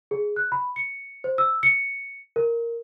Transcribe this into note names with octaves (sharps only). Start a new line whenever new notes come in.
G#4
F#6
B5
C#7
C5
E6
C#7
A#4